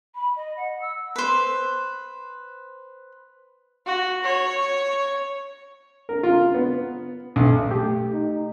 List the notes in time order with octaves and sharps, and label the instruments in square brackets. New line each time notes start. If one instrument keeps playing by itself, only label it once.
[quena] B5
D#5
F#5
E6
[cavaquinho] B4 C5
[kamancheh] F#4
C#5
[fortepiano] A#4
F4
B3
B1
[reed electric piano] A3 G4
[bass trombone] D#4